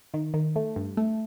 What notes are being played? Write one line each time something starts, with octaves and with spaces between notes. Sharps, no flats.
D#3
D#3
A3
G2
A3